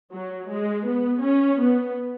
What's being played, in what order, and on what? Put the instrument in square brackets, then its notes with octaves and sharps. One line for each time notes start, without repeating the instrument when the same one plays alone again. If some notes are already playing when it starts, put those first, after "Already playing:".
[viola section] F#3
G#3
B3
C#4
B3